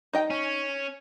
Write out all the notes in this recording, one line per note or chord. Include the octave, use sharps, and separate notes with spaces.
D#4 D#5 G5
C#4